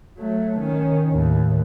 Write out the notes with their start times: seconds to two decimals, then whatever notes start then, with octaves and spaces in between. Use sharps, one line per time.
0.18 F#3 A3
0.60 D#3 C#4
1.11 D#2 A2